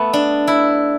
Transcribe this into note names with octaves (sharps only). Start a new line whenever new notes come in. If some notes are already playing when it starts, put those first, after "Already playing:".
Already playing: A3 B3
D4
E4